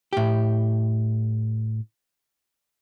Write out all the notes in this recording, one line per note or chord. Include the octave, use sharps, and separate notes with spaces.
A2 G4